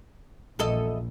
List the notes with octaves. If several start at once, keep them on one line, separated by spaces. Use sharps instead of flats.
A#1 E2 A4 D#5